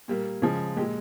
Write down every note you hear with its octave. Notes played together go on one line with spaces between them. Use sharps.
A#2 G3 A#3
C#3 F3 G#3
A#2 G#3 G4